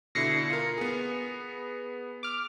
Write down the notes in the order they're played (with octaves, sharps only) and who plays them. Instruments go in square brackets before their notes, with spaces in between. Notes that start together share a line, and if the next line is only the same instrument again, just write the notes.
[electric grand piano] B2 D3 E4 [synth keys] A#6 C7 C#7
[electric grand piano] F4 A#4
B3 G#4
[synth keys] D6 F6